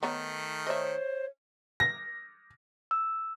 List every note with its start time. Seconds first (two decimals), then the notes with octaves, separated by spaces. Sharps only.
0.03 D#3 A3 B3 D#4 C#5
0.67 C5 C#5 D#5 E5
1.80 A#6
2.91 E6